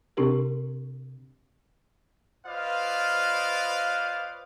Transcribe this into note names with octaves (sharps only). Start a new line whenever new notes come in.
C3 C4 D4 G4 A#4
F4 B4 C5 D5 D#5 F5